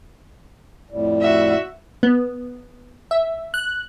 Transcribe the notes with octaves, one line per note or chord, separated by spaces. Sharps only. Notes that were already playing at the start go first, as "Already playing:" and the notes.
F2 A2 G3
F#4 E5
B3
E5
F#6